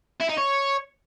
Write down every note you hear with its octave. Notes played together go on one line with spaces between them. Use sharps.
E4
D#4
C#5